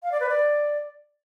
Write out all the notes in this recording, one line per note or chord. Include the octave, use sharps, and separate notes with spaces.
F5
D5
B4
D5